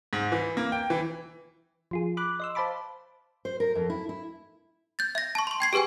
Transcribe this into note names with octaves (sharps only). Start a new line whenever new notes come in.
G#2
E3
A#3
G5
E3
F3 F4 G#4
B5 D6 F#6
D#5 C6 E6
C5 F5 A5 B5 D6
C5
A#4
F2
E4
E4
G6 A6
E5 A#6
A5 C#6
C6 C#6
G5 G#6 C7
G4 G#4 B4 G5 G#5